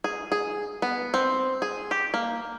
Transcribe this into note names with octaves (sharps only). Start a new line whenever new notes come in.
G#4
G#4
B3
C4
G#4
G4
A#3